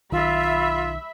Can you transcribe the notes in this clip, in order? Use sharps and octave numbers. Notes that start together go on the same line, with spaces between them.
B1 D#3 F4 E5 B5